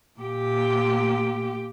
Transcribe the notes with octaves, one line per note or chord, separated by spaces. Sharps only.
A#2 G4